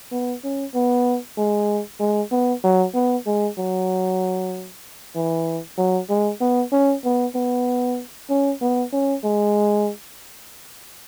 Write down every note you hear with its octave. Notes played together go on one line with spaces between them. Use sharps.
B3
C#4
B3
G#3
G#3
B3
F#3
B3
G#3
F#3
E3
F#3
G#3
B3
C#4
B3
B3
C#4
B3
C#4
G#3